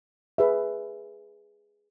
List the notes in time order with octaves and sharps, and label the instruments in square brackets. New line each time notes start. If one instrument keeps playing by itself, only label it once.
[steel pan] G#4 B4 E5